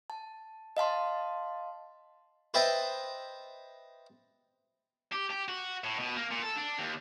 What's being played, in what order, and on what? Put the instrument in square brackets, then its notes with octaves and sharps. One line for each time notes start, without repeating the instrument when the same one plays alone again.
[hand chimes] A5
D#5 F5 A5 C6
[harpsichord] B4 C5 D#5 E5 G5 A5
[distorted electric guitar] G4
G4
F#4
A2
B2
A#3
A#2
A4
D4
D#2